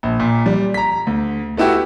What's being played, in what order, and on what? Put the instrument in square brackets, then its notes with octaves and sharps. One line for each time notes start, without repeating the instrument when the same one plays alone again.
[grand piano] A#1
A#2
G3
A#5 B6
D2
A3 B3 E4 F#4 G4